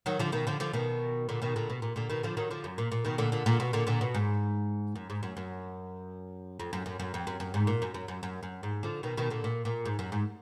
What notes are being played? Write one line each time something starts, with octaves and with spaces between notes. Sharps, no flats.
D#3 F#3
D3 F3
B2 D#3
D3 F3
D3 F3
B2 D#3
A#2 D3
B2 D#3
A#2 D3
B2
A#2
A#2 D3
B2 D#3
D3 F3
D#3 F#3
D3 F3
F#2
A#2
A#2
B2 D#3
A#2 D3
A#2 D3
A#2 D3
B2
A#2 D3
A#2 D3
B2
G#2
F#2
G#2
F#2
F#2
F2
F#2
F#2
F#2
F2
F#2
F#2
G#2
A#2
F#2
F#2
F#2
F#2
F#2
G#2
D3 F3
B2 D#3
B2 D#3
A#2 D3
A#2
A#2
G#2
F#2
G#2